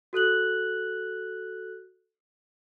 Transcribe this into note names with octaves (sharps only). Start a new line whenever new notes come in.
F#4 A4 F#6 F#7